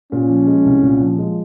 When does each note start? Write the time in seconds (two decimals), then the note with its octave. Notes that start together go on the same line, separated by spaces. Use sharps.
0.12 A#2 C#4
0.29 F3
0.47 G#3
0.66 C2
0.83 A#2
1.01 F3
1.19 G#3